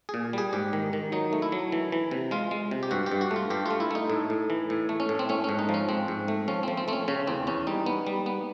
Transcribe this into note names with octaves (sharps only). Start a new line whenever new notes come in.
A#2 G#4
G3 G#4
G#2 G4
D#3
D#3
F#3 D#4
A3
E4
F#3
E3
E3
C3
G#3 F4
G#3
C3
G4
G2 F#4
G4
G2
F#4
A3
F4
G2 G4
A3 F4
E4
A3 D#4
A2
A2
E3
A2
A3
C#4
A2
C4
A3 C#4
G#2 C#4
D#4
F3
C#4
G#2 C4
G#2
A3
F3 C#4
F3 C4
C4
A3 C4
C#4
C#3 C#4
E2 C4
E2 C#4
G3 D#4
B3
G3
B3